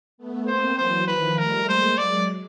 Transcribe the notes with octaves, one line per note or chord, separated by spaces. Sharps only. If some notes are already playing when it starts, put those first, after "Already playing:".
A3 B3
A#3 C4 C5
E3 F#3 C5
D#3 F3 B4
G3 A3 A#4
G#3 A#3 C5
F#3 G#3 D5